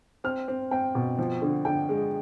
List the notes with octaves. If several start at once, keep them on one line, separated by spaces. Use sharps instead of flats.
C4 F6
C4
C4 G5
B2
F3
D3
D3 G5
G#3